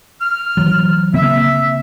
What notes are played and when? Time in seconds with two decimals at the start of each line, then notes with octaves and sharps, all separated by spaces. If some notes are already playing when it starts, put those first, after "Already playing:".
0.21 F6
0.57 E3 F#3
1.14 C#3 A#3 C4 E5